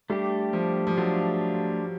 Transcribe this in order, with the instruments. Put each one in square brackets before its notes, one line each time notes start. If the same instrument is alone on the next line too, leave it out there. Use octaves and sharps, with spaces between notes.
[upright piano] G3 [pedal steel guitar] A3 D4 G4
[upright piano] F3
F3
[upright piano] F#3 [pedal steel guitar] A3 D4 F4